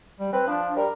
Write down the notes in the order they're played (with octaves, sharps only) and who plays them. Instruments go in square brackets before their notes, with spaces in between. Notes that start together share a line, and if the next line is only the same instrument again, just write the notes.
[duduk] G3
[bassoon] C4 [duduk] B4
[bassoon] F3 [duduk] D4
[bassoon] G3 [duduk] A#4